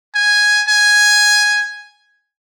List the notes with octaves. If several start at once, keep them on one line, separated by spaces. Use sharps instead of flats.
G#5
G#5